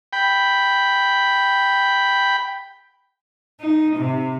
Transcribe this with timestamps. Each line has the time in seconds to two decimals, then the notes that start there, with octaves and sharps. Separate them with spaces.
0.13 G5 B5
3.60 D#4
3.96 C3